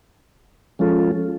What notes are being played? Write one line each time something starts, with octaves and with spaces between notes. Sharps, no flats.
F3 G#3 C#4 F4 A4